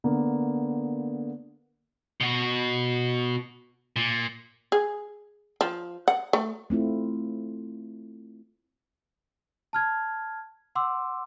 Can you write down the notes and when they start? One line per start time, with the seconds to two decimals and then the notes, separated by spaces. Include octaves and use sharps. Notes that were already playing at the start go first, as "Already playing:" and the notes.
0.04 D3 A#3 B3
2.21 B2 F#4
3.96 A#2
4.72 G#4
5.61 F3
6.08 F#5
6.33 A3
6.70 A3 C4 E4 F4
9.73 A5 F6 G#6
10.75 F#5 C6 D6 E6